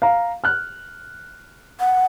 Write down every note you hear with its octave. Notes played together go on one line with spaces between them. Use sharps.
F5 A#5
F6 F#6
F#5